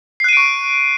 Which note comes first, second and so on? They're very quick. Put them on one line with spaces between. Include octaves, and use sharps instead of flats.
C7 F#6 D#7 D7 C#6